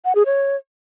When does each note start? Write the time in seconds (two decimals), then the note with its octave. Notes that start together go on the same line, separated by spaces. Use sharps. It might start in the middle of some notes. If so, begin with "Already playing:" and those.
0.05 F#5
0.15 G#4
0.26 C#5